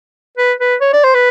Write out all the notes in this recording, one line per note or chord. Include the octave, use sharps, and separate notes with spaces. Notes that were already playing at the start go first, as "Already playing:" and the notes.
B4
B4
C#5
D5
C5
B4